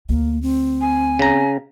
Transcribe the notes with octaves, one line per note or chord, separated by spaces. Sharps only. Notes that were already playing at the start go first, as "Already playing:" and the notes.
D2 A#3
C4
G#5
C#3 A#5